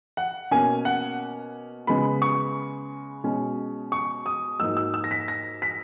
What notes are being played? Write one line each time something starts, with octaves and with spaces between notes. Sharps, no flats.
F#5
B2 A#3 C#4 G#5
F#5
C#3 G#3 B3 B5
C#6
B2 G#3 C#4
C#6
D#6
G#2 F#3 A#3 D#4 E6
E6
E6
A#6
B6
A#6
B6